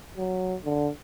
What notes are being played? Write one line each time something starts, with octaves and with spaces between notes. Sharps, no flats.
F#3
D3